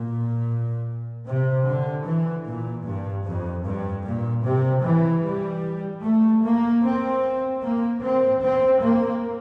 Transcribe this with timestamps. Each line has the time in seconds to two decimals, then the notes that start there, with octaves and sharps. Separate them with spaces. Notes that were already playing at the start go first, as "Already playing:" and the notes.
Already playing: A#2
1.25 C3
1.65 D3
2.04 E3
2.45 A#2
2.84 G2
3.25 F2
3.64 G2
4.05 A#2
4.44 C3
4.83 E3
5.24 G3
6.03 A3
6.43 A#3
6.83 C4
7.62 A#3
8.02 C4
8.42 C4
8.82 A#3